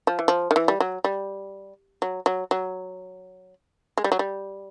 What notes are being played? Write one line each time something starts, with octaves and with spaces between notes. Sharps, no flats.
F3
E3
F3
D#3
E3
G3
F#3
G3
F#3
F#3
F#3
G#3
G3
F#3
G3